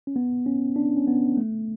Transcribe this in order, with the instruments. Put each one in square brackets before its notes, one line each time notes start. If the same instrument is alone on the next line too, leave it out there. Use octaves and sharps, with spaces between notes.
[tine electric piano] C#4
B3
C#4
D4
C#4
B3
A3